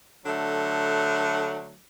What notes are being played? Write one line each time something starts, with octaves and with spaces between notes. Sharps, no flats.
D3 F#3 A3